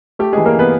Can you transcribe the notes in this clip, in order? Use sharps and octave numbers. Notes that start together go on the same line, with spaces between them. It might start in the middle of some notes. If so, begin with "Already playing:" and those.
A3 G4
E3 G#3 G#4
A#3 A#4
E3 B3 B4